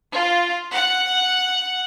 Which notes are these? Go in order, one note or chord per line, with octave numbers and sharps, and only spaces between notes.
F4
F#5